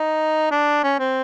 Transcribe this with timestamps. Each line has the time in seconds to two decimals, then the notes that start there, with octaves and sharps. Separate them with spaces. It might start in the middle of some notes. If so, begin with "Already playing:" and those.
Already playing: D#4
0.51 D4
0.84 C#4
0.99 C4